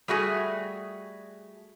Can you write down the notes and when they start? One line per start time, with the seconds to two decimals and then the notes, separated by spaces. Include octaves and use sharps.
0.08 G3 A3 F#4 G#4